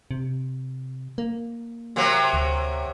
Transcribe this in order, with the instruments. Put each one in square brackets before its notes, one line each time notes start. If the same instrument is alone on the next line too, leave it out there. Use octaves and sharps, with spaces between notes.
[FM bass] C3
A#3
[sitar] C3 F#3 A#3
[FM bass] D2